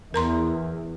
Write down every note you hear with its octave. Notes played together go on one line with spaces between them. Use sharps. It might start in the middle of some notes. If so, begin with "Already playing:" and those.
E2 A#4 A#5 C6